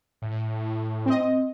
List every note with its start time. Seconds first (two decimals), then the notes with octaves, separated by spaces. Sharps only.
0.22 A2
1.06 C4 D#5